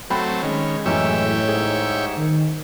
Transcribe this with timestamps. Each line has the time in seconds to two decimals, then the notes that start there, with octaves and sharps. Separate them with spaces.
0.10 F#3 A3 C4 G5 B5
0.43 D#3 G#3 C#4
0.86 F#2 A2 E3 G4 C#5 E5 E6
1.48 G#2 G#4
2.18 D#3